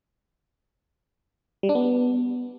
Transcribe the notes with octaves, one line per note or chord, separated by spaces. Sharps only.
G3
D4
B3